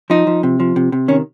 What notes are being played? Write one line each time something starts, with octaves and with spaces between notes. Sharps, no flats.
F3 D#4
F3
C3
F3
C3
C3
D#3 C#4